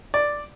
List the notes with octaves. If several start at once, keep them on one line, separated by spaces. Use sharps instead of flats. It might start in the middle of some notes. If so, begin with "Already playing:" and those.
D5